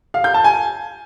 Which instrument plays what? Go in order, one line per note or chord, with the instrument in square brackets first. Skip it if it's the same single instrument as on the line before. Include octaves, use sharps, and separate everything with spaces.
[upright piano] F5
G6
A5
G#5